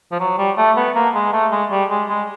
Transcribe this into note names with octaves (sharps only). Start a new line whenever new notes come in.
F3
F#3
G3
A3
B3
A#3
G#3
A3
G#3
G3
G#3
G#3